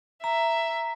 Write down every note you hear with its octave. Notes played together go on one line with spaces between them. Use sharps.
E5 A#5